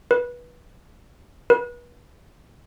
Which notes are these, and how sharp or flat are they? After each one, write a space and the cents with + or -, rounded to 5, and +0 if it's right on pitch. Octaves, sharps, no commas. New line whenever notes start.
B4 -20
B4 -35